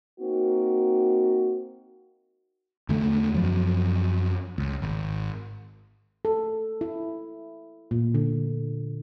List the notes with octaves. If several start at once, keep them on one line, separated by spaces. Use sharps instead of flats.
A#3 C4 D#4 F#4
E2 D3 A3
F#2 F3 F#3
C#2
G#1
A4
E4
A#2
D3